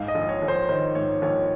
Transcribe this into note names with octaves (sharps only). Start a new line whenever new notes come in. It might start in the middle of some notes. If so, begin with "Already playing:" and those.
Already playing: G#2 F5
D#5
A#1
C#5
A#1
C5
D#3 C5
G#2 C#5
A#1 C#5